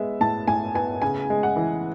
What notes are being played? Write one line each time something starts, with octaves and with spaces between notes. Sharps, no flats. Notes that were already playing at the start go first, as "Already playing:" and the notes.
Already playing: G#3 B3 E5
A2 A5
A2 G#5
B3 G#5
C#3 G#5
G#3
F#5
E3